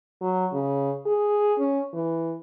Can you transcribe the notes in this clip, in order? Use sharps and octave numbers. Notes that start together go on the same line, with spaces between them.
F#3
C#3
G#4
C#4
E3